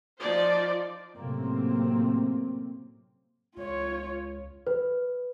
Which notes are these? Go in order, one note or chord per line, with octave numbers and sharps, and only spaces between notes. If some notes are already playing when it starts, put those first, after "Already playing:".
F3 D#4 C5 D5
F#2 A2 C3 A#3 C4
C#2 F4 C#5
B4